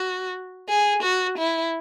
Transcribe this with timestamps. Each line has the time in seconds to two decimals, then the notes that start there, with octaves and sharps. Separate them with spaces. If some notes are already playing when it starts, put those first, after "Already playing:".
Already playing: F#4
0.69 G#4
1.03 F#4
1.38 E4